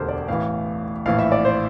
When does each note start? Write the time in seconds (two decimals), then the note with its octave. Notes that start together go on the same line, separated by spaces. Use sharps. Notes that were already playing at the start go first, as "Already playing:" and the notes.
Already playing: E1 D2 D3 G4 A4 A#4 C5
0.08 D5
0.28 A1 A2 E3 F5
1.06 A#1 A2 E3 F5
1.19 E5
1.32 D5
1.45 C5